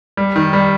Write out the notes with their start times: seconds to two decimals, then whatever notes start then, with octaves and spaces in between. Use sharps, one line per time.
0.17 G3
0.36 D#3
0.53 G3